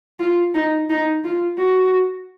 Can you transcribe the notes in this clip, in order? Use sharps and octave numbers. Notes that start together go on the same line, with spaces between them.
F4
D#4
D#4
F4
F#4